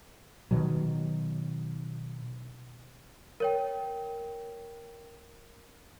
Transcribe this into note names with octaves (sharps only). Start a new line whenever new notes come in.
B2 D#3 F#3
A#4 C#5 G5